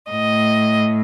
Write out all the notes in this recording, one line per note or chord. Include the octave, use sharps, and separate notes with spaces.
A2 D#5